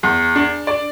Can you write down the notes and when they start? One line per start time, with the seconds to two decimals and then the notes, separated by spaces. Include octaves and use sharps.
0.03 E2
0.35 D4
0.67 D5